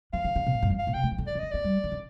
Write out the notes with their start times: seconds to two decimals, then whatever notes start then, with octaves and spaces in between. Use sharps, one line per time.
0.13 F3 F5
0.25 D#3
0.36 D3
0.46 C3
0.54 A#2
0.62 G2
0.70 F2
0.79 F5
0.87 A#2
0.94 C3 G5
1.03 A3
1.11 F3
1.18 D3
1.27 F3 D5
1.35 D#3
1.39 D3 D#5
1.51 A#3 D5
1.64 G3
1.84 D#3
1.92 D3